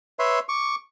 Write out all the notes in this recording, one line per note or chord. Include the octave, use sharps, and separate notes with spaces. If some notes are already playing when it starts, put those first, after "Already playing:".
B4 C#5 E5 C6
C#6 D6